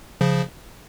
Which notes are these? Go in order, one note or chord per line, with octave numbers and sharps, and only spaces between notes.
C#3 F3